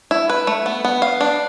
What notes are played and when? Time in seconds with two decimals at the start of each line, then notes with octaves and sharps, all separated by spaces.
0.11 E4
0.29 B4
0.47 A3
0.66 B3
0.85 B3
1.02 F5
1.21 D4